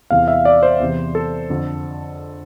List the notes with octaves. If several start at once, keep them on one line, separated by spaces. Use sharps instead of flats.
E2 C3 E3 F5
E5
D5
C5
E2 C3 E3
A4
F2 D3